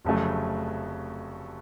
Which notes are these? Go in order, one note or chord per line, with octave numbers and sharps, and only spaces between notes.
F1 F2 C#3 F#3 A3